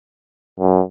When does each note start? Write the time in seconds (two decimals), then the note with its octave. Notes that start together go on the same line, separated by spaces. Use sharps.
0.60 F#2